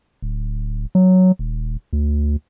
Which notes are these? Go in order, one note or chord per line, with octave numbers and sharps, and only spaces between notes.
D1
F#3
D#1
D2